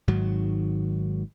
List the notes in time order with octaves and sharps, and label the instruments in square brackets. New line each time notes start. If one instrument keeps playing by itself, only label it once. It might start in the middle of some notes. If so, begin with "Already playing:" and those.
[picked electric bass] G#1 G#2 D#3 F#3